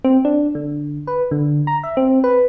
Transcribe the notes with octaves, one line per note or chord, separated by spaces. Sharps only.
C4
D4
D3
B4
D3
A#5
E5
C4
B4